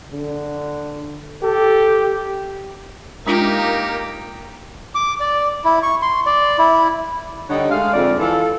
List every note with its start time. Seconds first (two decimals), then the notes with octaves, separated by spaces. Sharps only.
0.13 D3
1.42 G4 A4
3.27 G#3 A#3 D4 D#4 F4 G4 A#4
4.95 D6
5.20 D5
5.65 E4
5.83 C#6
6.02 C6
6.26 D5
6.59 E4
7.49 D3 G3 D#4 C#5 F#5
7.70 G#3 A3 F5
7.93 F2 G#2 D3 D5
8.18 E3 F4 A4